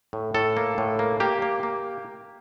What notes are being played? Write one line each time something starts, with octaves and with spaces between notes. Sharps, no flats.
A2
A2 A4
A#3
A2
A#3
A#3 G4
A#3
A#3